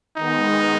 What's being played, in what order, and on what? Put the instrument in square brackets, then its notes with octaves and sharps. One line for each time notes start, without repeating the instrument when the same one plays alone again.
[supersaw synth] D#3 G#3 B3 [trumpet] D#4